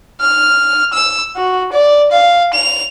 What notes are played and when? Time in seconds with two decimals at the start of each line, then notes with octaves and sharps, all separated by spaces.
0.21 F6
0.93 E6
1.36 F#4
1.72 D5
2.12 F5
2.53 F7